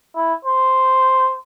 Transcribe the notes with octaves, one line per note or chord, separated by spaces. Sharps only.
E4
C5